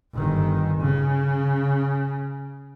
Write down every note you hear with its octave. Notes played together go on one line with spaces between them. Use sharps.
G1 D#3
C#3